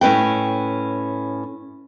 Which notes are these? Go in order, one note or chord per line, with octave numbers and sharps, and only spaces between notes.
A2 C#4 B4 G5